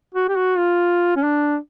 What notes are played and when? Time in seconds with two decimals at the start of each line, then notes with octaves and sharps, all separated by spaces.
0.14 F#4
0.28 G4
0.36 F#4
0.58 F4
1.16 C#4
1.23 D4